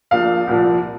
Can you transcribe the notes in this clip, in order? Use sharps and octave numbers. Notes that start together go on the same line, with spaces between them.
A#1 A#2 F3 F5
C2 A#2 F3